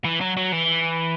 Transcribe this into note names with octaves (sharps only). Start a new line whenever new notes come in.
E3
F#3
F#3
E3